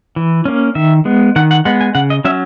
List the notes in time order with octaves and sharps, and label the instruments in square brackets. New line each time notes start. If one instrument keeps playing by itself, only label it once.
[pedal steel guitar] E3
A#3 C#4
D#3 E5
G#3 B3
D#3 F#5
F#5
G#3 B3 F#5
G#5
C#3 F#5
D#5
F#3 C#4 E5